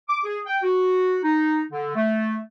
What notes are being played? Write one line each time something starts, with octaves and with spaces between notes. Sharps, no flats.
D6
G#4
G5
F#4
D#4
D3
A3